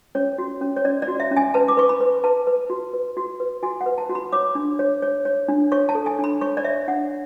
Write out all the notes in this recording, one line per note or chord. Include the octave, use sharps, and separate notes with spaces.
C#4 C#5
F#4
C#4
C#5
C#4 D5
D5
F#4
E5
C#4
G#5
B4 A5
D6
B4 C#6
B5
B4
B4 A5
B4
F#4
B4
F#4
B4
F#4 G#5
F#5
B4
A5
F#4
B5
C#5 D6
D4
C#5
C#5
C#5
D4
C#5 C#6
A5
A4
G#5
D4
B5
C#5 C#6
D5
C#5 E5
D4 F#5